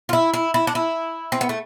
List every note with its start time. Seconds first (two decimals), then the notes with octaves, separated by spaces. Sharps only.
0.09 F4
0.13 E4
0.34 E4
0.54 E4
0.67 D4
0.75 E4
1.32 C4
1.41 B3
1.49 A3